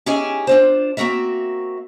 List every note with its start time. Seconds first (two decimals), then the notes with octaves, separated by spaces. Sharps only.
0.06 C#4 D#4 E4 G4 G#4 G#5
0.47 D4 F4 C5
0.97 A#3 C4 F#4 A#4 E5